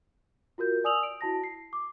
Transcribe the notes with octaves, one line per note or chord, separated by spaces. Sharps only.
F4 F#4 A#4 G6
D5 G#5 D#6 E6 F7 F#7
D7
E4 F#4 A5 A#6
C7
D6